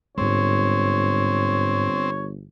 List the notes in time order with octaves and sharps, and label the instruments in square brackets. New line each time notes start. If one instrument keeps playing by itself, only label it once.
[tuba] G1 [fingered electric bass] G#2 G#3 [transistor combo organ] C4 [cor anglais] C#5